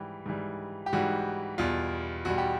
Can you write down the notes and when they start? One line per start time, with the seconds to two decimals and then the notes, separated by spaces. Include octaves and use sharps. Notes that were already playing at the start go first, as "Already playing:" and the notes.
Already playing: G#2 E3 G3 G4
0.26 G#2 E3 G3
0.86 G4
0.93 G#2 E3 G3 F#4
1.58 E2 B2 G3 F4
2.25 E2 B2 G3 F#4
2.38 G4